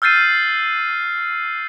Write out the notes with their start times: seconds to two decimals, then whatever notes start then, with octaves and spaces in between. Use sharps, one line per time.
0.02 E6 F6 G6 A6 C7 D#7